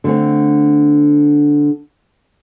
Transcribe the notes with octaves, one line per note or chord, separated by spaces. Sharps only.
D3 A3 C4